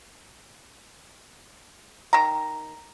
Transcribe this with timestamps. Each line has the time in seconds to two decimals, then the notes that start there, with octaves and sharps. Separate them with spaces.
2.13 D#3 A#5